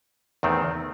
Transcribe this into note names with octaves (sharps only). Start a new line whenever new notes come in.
E2 D#3 A3 C4